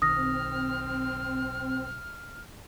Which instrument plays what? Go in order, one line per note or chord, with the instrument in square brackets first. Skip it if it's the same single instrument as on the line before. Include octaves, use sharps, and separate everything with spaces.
[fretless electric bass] B1 D#3 [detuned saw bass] C4 [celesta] D#6 A#6 [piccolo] F6